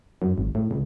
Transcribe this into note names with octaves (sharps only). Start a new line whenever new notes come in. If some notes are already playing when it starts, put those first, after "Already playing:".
F#2
G#1
A2
C#2